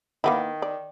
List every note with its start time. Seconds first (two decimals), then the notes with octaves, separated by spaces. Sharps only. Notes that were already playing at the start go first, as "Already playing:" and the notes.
0.24 D#3 A#3 B3 E4
0.62 D5